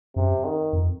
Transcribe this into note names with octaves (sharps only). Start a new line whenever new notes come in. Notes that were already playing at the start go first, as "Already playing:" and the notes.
F#2 C3
D#3
F2